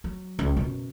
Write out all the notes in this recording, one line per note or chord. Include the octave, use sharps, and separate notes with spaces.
F#3
C#2
F#2 B2